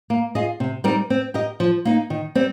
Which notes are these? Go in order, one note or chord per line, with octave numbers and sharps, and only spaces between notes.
A#3
F4 G#4 D#5
C3
G3 C4 D#4 A#4
C4
G4 A#4 D#5
F3
A#3 D#4
D#3
G3 C4